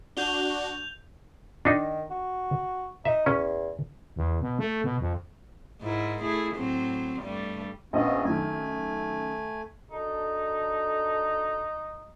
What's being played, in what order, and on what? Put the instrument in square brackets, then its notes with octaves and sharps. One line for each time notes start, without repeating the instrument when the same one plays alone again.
[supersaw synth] D4 F#4 [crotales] G6 F7 G7
[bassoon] D#3 [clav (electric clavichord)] D4 D#4
[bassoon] F#4
[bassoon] D#4 [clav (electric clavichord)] E5
[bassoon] E2 [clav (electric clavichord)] C#4
[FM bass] E2
B2
A3
B2
F2
[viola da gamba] G#2 E4 A#4
A3 E4 G#4
A2 F#3 C4
G2 G3 A3
[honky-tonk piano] A#1 D#5 [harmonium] A#3 B3 C#4
[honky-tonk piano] F#2 D#3 [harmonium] A3 G#5
[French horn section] D4 F#4 A4 [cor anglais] D#4